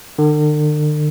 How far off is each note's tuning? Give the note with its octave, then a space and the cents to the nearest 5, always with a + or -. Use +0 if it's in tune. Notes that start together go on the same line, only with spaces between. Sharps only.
D3 +45